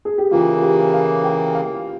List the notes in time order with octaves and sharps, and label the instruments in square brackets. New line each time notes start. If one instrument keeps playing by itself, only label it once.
[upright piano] G#4
G4
[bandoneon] C#3 E3 A#3 [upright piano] F4
[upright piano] G4
F5
G5
F5